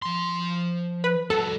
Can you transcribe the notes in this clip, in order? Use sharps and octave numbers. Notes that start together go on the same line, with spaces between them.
F3 C6
B4
G3 F#4 A4